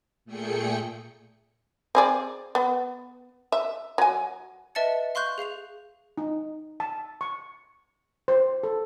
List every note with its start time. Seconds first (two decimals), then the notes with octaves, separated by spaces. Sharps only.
0.25 A#2 A3 G#4 G5 C#7
1.95 C4 G#4 D5
2.55 B3
3.52 E5
3.98 F#3 G#5
4.75 B4 D#5 E5 A5 A6 C#7
5.15 F5 C6 C#6 F#6 G6
5.38 G#4 F5 C7 F7
6.18 D#4
6.80 A5
7.21 C#6
8.28 C5
8.63 A4